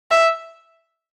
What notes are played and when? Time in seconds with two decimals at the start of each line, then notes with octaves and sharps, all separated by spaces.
0.11 E5